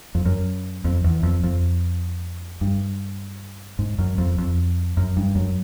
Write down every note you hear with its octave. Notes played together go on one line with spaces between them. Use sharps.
F2
F#2
F2
E2
F2
F2
G2
G#2
F#2
F2
F2
F#2
G2
F#2